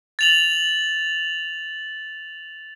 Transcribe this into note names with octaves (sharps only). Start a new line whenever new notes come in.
A6 F7 F#7